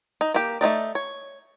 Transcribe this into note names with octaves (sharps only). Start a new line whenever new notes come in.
D#4
A#3 G4
A3 C#4 D#4 D5
C#5